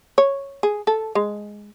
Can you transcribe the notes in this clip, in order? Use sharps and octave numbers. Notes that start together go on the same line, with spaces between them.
C#5
G#4
A4
G#3